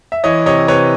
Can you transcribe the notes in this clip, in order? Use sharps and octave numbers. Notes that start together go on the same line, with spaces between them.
E5
E3 C#5 D#5
C3 C#5 D#5
C3 B4 C#5